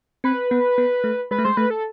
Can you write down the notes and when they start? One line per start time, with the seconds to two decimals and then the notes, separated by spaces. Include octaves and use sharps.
0.24 C4 B4
0.51 B3
0.78 B3
1.04 A3
1.31 G#3 B4
1.39 A3
1.45 G#3 C5
1.57 A3 B4
1.70 A4